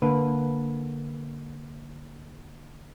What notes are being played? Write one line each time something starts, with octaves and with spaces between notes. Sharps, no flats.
D3 A#3 B4